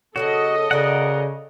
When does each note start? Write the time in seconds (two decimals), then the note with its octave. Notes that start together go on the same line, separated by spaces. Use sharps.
0.16 C#3 F3 F#3 F#4 A4 D#5
0.71 C#3 F#4 A#4 D5 F#5